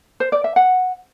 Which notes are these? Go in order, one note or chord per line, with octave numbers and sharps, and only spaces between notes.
C5
D5
E5
F#5